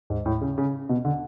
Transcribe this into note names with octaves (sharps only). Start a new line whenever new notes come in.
G#2
A2
C#3
C#3
B2
D3